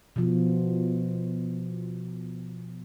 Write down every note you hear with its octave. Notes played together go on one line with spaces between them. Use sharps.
B2 F3